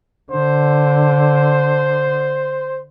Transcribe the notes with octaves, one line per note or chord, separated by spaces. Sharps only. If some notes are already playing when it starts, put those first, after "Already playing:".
D3 C5